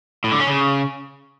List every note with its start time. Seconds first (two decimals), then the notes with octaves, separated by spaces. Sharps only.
0.24 A2
0.32 D3
0.40 C#4
0.47 C#3